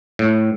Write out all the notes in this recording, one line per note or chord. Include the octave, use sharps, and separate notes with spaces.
A2